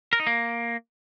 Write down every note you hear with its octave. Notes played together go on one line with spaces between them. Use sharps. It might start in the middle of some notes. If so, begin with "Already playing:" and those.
A#4
D#4
A#3